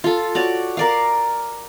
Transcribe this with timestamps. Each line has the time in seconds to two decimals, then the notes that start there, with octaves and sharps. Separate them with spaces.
0.04 F4 A4
0.35 F#4 C#5 D5
0.77 A#4 D5 F5